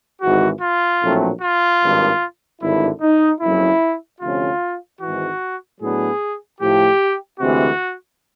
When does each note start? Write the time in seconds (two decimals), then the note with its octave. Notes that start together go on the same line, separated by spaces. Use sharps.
0.21 G#1 G#2 E3 F#4
0.61 F4
1.02 A#1 A2 F#3 A3 C4
1.42 F4
1.81 G#1 G2 D#3
2.61 G#1 G2 D3 E4
3.01 D#4
3.41 F#1 F2 C#3 F#3 E4
4.21 D2 C3 F3 A3 C#4 F4
5.01 G#1 G#2 E3 F#4
5.80 A2 F#3 B3 D4 G#4
6.60 A2 F3 A3 G4
7.39 D2 C3 E3 G#3 C4 F#4